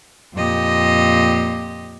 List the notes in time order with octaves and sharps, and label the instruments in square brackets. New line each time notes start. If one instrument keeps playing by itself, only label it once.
[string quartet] F2 A#2 G4 D#5